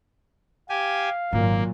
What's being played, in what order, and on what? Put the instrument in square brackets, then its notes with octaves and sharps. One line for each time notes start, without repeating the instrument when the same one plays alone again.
[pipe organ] G4 G#5 [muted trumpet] F5
[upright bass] G#1 [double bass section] A#2 F#3 [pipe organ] A#3